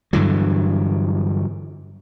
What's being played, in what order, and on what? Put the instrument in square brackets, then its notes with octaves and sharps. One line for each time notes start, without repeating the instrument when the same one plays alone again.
[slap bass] G2 D3 E3 F#3